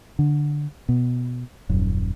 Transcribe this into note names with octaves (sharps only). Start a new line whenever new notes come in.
D3
B2
D#1 F#2